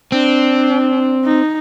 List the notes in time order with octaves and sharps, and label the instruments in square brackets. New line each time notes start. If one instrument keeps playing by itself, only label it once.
[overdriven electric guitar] C4 [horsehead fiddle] D4
[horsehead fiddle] D#4